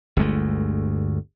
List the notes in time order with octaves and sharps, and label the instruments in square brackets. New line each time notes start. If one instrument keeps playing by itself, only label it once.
[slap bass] G1 D2 G#3 A3